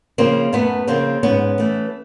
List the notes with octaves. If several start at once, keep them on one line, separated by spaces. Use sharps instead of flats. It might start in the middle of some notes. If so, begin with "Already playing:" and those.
C#3 F3 A#3 C4
F#2 A3 B3
C#3 F3 A#3 C4
G#2 B3 C#4
E3 A3